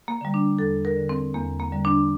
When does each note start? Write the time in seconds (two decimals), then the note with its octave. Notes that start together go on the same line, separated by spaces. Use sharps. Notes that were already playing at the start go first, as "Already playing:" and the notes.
0.08 A#3
0.21 D3 G3
0.34 D4
0.59 E2 A4
0.85 A#4
0.97 D3 G3
1.09 C4
1.34 E2 A#3
1.59 A#3
1.72 D3 G3
1.85 D4